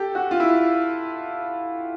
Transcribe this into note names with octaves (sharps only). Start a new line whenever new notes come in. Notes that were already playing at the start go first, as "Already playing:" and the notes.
Already playing: G4 A4
F#4
F4
E4